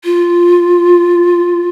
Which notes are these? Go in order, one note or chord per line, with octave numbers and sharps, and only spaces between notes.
F4